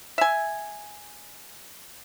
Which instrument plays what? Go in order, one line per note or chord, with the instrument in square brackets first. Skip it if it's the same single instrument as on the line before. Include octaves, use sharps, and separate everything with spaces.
[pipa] E5 G#5